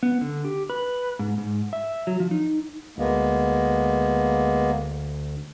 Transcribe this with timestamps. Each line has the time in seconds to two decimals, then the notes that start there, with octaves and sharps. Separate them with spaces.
0.03 B3
0.21 D3
0.45 G4
0.70 B4
1.19 G#2
1.38 G#2
1.73 E5
2.07 F#3
2.20 F3
2.31 D#4
2.98 D2 G#3 A#3 B3